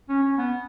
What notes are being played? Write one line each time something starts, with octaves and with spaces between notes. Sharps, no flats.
C#4
C#4
B3